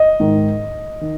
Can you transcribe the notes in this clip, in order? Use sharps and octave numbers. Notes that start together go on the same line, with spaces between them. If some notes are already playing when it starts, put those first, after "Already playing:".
Already playing: D#5
G#2 D#3
D#3